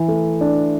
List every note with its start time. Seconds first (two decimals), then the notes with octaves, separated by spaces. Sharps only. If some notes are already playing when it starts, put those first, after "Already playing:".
Already playing: E3
0.08 A3
0.41 D4